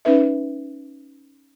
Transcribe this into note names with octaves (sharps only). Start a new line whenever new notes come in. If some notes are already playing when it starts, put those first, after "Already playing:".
C#4 D#4 B4 E5